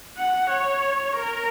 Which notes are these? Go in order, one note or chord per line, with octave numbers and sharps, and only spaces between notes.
F#5
C#5
A#4